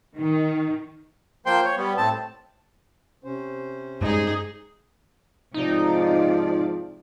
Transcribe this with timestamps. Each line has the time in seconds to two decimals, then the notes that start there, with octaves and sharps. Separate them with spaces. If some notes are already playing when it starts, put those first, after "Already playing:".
0.16 D#3
1.46 F3 A#3 C5 G5 C6
1.64 C#5
1.77 G3 B3
1.97 A2 C4 A5
3.24 C3 C#4 C5
4.01 G2 G#3 D#4 G#4
5.54 G#2 C3 F3 D#4 D5